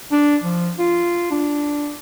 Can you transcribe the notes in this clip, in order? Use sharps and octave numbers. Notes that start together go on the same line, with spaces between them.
D4
F3
F4
D4